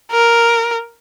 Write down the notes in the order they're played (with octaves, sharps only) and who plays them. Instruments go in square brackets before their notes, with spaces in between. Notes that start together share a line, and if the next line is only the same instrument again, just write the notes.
[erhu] A#4